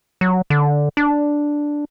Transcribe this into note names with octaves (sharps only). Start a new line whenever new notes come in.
F#3
D3
D4